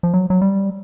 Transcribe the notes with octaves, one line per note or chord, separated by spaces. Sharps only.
F3
F#3
F#3
G3